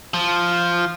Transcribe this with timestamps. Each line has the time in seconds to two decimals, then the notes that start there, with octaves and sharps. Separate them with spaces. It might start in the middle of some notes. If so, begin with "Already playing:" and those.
0.14 F3